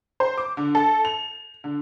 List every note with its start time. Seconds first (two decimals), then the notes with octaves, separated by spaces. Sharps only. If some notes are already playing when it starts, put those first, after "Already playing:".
0.20 C5
0.38 D6
0.57 D3
0.75 A4
1.05 F7
1.64 D3